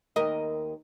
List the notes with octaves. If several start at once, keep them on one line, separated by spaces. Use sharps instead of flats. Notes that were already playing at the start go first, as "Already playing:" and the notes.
D#2 A#4 D#5